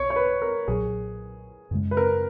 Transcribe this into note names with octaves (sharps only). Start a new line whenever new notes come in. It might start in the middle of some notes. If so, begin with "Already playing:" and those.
Already playing: B1 C#5
C#5
B4
A#4
B1 A#2 F#3 G#4
F#2 C#3 G#3
B4
A#4